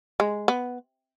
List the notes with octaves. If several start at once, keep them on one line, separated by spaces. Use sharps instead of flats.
G#3
B3